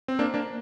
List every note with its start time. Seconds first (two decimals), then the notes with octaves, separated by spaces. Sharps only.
0.08 C4
0.19 A#3 D4
0.34 A#3 D4